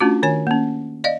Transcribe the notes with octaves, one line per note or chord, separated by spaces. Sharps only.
A3 C#4 D4 F4 F#4
D#3 C#5 G#5
A#3 C#4
D5 D#5 F5